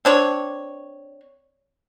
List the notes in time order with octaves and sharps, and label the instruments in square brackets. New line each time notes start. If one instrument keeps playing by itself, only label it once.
[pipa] C4 D4 C#5